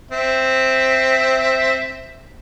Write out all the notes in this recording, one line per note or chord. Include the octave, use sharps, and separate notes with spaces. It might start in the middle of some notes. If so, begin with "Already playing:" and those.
C4 E5